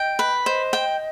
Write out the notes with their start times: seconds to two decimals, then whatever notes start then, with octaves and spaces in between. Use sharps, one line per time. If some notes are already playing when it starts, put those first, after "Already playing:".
Already playing: D#5 G5
0.19 B4
0.46 C5 D#5
0.73 G5